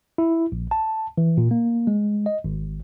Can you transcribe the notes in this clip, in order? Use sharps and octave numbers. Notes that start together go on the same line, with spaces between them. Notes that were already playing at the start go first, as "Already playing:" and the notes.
E4
A#1
A5
E3
A#2
A#3
G#3
D#5
G#1